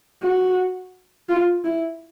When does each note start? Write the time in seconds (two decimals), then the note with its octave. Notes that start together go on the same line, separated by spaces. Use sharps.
0.22 F#4
1.29 F4
1.64 E4